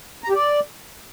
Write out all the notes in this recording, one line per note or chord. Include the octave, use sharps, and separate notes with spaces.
A#5
G4
D5